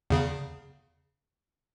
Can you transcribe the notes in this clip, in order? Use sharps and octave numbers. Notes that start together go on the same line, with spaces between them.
E2 C#3